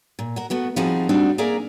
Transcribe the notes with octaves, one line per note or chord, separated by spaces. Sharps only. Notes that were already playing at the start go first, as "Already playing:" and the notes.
A#2
F#4 A#4
A3 B3 F#4
F3 G3 C4 D#4 F#4 G#4
G3 A3 C4 D4 D#4 F#4
A#3 G#4 A#4 D5 E5 G#5